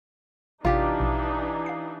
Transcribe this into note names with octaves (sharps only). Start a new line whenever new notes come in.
A1 C3 E3 D4 D#4 F4 G4 B6
A#1 B2
F5 C7